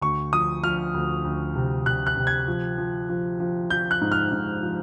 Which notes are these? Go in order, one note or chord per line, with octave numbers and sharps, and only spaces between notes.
D2 C#6
F3 D#6
F3 F6
D2
D2
C3
C3 F#6
F#6
C3
G#6
F3
F3
F3
F3
F3 G6
F#6
G#2
F6
G#2
F3